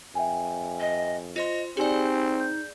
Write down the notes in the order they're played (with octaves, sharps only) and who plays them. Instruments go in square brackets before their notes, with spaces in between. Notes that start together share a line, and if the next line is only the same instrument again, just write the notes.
[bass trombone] F2 [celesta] E5 G5 G#5
[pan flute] D#5
[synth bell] F4 C5 C6 [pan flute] D#5
[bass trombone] C4 [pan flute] D#4 [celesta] G4 G#5 [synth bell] G#4 D5
[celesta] G6